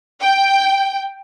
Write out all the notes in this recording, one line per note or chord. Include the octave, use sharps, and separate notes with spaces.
G5